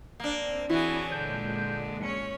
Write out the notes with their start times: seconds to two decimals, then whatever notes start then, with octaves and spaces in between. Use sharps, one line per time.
0.20 A#3 C4 D4
0.70 E3 E4 F#4 G#4 C#5 D5 A5
1.12 A#2 D3 G#3 G6
2.03 C#4 C#5 C#7